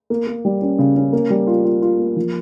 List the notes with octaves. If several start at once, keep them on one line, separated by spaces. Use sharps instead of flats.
A#3
A#3
G3
C#4
C#3
C#4
A#3
G3
F4
F4
F4
A#3
F3